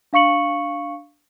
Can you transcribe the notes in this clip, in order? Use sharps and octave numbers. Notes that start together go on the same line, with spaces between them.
D4 F5 C#6 C#7 F#7